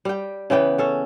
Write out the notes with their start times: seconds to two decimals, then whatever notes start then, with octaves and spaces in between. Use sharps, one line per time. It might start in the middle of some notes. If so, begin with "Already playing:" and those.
0.05 G3 G5
0.50 C#3 E3 B3 G5
0.78 C#4 A4